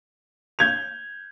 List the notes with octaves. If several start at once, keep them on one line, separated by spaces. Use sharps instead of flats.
G6 G#6 F7